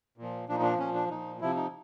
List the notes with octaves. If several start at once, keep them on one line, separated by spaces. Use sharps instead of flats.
A#2 F3
A#2 F3 D4
D#4
D4
A#2 F3 C#4
D4
A#2 F3 D#4
C3 F3 E4
D#4